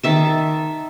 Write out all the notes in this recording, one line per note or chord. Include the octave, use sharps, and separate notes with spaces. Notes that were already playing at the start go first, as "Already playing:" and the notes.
D#3 E5 A5